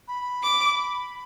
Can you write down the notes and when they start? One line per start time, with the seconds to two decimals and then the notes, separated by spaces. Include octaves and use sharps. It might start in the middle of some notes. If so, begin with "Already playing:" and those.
0.08 B5
0.43 D6